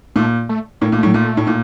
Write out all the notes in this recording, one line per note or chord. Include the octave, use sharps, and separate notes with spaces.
A#2 A3
A3
A2 A#3
A#2
A3
A2
F#3
A#2 A3
A2
A#2